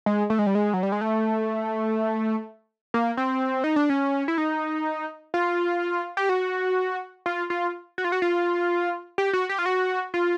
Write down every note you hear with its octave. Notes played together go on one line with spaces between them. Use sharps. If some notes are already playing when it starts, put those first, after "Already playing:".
G#3
A3
G#3
G3
G#3
F#3
G3
G#3
A3
A#3
C4
D#4
D4
C#4
E4
D#4
F4
G4
F#4
F4
F4
F#4
F4
F#4
F4
G4
F#4
G4
F4
F#4
F4